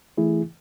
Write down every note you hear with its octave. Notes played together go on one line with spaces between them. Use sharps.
E3 A3 E4 G#4